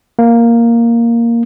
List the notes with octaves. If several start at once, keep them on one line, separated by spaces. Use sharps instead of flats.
A#3